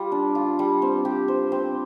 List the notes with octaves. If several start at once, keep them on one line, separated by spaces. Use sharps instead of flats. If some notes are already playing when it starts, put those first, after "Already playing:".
Already playing: G3 F4
D4
F4
G3
C4
G4
C5
C4